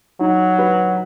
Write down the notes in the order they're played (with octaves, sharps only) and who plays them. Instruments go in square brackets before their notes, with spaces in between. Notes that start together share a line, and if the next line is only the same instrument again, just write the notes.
[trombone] F#3 [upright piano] D#4
[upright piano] B4